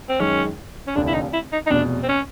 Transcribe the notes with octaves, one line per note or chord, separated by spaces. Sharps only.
C4
F#2 D#3 G#3 C#4
C#4
F1 D#2 D3 D4
E4
D#4
E4
D#4
D#4
F1 E2 B2 D4
C4
C#4